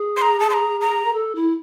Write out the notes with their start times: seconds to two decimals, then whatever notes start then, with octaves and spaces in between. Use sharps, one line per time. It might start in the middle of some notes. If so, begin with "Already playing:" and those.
Already playing: G#4
0.17 C6
0.22 A#5
0.40 A5
0.50 C6
0.54 A#5
0.81 A#5
1.05 A#4
1.13 A4
1.35 E4